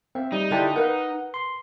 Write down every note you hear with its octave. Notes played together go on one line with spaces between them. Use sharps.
C4 E5 F5
G3 D#4
D3 D4 E4 F4 G4 D5
A#4 B4 F5 F#5
C6